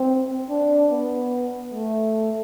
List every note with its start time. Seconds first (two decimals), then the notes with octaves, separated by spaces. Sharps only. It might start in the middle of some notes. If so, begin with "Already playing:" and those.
Already playing: C4
0.50 D4
0.91 B3
1.74 A3